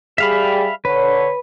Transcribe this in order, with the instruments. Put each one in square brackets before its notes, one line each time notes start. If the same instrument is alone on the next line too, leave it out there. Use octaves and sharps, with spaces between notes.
[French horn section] G3 G#4 [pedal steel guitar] E5 F5 B5
[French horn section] D3 C#5 [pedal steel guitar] B4